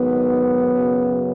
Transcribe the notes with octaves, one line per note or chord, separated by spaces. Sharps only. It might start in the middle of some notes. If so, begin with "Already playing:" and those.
Already playing: G#2 D#3 F#3 B3
F#2 C#3